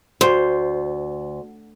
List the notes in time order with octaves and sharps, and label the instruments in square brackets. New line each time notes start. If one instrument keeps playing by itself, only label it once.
[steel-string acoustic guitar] D2 [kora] C5